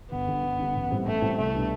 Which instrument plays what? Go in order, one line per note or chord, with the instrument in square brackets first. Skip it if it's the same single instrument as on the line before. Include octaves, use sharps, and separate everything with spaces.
[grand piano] G1 [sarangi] B3
[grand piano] G2 D3
G1
G2 D3
A1
A2 G3 C4 E4
[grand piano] A1 [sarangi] A3
[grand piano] A2 G3 C4 E4
[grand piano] C2 [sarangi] A3
[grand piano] B2 G3 D4